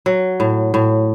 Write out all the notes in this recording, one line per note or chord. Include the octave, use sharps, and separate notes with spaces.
F#3
A2
A2